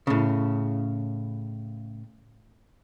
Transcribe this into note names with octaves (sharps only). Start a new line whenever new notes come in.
A2 C#3